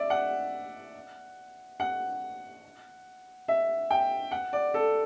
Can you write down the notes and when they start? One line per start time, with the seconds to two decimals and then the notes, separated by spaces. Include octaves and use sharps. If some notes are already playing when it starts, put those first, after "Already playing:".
Already playing: D5 E5
0.10 F#5
1.80 F#5
3.48 E5
3.90 G5
4.31 F#5
4.53 D5
4.74 A4